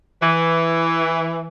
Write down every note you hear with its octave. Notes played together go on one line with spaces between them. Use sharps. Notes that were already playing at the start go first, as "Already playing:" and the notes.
E3